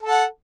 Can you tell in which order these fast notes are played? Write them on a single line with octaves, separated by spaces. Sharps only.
A4 A5 F#5